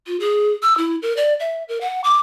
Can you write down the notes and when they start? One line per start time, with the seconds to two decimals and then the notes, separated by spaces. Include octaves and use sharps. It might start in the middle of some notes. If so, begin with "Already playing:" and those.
0.07 F4
0.20 G#4
0.63 E6
0.78 E4
1.02 A#4
1.17 D5
1.40 E5
1.69 A#4
1.81 F#5
2.04 D6